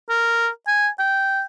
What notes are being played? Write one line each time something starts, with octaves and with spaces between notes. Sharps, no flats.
A#4
G#5
G5